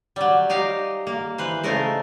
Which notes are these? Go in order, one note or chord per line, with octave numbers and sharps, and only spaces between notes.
F#3 G3
D#4 G4 F5 A#5
A#3
E3 B4 C5
C#3 A3 D#4 A#4 C5